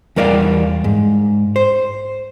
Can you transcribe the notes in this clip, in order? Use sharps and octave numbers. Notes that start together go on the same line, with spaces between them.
E2 G3 A#4 D5 D#5 F5
G#2
C5